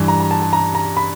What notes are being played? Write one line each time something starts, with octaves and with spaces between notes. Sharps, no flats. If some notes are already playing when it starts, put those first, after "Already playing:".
Already playing: G2 E3 G3
A#5
A#5
A5
A5
A#5
A#5
B5